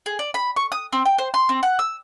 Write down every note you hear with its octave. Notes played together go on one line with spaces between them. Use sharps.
G#4
D5
B5
C#6
D#6
C4
G5
C5
C6
C4
F#5
E6